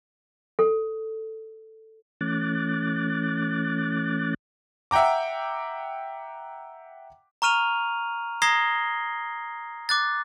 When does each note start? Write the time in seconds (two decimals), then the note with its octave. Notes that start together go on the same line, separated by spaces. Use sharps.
0.59 A4
2.21 E3 A3 C#4 D6 F#6 A6
4.91 E5 F#5 G5 A#5 D6
7.42 A#5 C#6 F6 D#7 F7
8.42 A#5 D#6 G#6 A#6 C7 G7
9.89 D6 F#6 A6